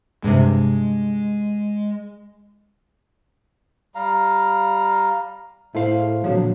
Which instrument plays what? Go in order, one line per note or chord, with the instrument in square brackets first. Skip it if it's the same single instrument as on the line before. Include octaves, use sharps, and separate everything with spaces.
[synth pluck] G2 C3 [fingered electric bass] G#3
[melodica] G3 F5 A#5
[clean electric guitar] A2 F5 [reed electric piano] E4 A4 C5
[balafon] G#4
[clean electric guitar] A#2 D3 F3 [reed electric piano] F#3 [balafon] C4 F#4 C#5